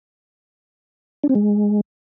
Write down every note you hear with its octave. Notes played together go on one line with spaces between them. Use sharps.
D4
C4
G#3